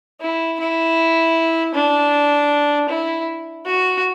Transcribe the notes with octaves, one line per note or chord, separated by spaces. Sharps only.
E4
E4
D4
E4
F#4